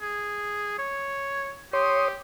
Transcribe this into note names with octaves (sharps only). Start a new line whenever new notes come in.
G#4
C#5
G4 C#5 C6 D#6